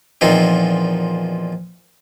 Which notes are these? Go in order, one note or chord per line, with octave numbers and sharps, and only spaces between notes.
E2 A#2 F3 C4 D#4